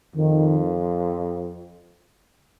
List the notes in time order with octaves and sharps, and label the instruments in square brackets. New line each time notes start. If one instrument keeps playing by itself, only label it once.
[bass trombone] F2 [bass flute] D#3